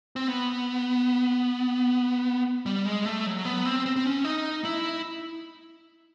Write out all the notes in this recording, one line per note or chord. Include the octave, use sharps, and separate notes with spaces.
C4
B3
G3
G#3
A3
F#3
B3
C4
C4
C4
C#4
D#4
E4